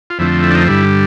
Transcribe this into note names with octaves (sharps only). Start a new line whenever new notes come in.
F4
F2 D3 F3 A3 C4 E4
E4
D4
D#4
G2 D3 G3 E4